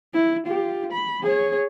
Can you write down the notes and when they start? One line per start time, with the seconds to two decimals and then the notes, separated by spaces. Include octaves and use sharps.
0.14 E4
0.46 F4 G4
0.92 B5
1.23 G#4 C#5